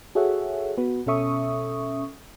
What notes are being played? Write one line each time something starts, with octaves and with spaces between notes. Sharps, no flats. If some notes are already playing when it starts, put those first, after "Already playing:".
F#4 G#4 A4 C#5 E5 F#5
B3 F#4 B4
B2 C#4 A4 E5 C#6 D#6